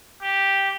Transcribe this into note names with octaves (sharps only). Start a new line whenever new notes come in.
G4